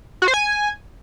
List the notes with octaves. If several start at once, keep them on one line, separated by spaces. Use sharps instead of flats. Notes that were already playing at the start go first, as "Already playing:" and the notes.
F#4
C5
G#5